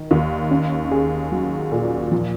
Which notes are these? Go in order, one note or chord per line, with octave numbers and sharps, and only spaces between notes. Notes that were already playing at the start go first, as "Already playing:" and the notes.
Already playing: D#3
D#2
C#4
G#4
F#3
A#2
F3